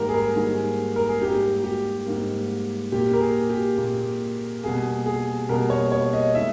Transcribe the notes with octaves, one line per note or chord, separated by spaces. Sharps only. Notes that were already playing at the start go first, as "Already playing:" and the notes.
Already playing: G#2 D#3 G3 A#3 G4 A#4
G#4
A#4
G#2 D#3 G3 A#3 G#4
A#4
G#4
G#2 G3 A#3 G4
G4
G#2 G3 A#3
A#2 A#3 G4
A#4
G#4
G4
A#2 A#3
B2 G3 A#3 G#4
G#4
B2 G3 A#3 A#4
C#5
C#5
D#5
D#3 G#3 E5